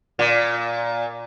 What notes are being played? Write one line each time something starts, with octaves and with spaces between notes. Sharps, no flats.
A#2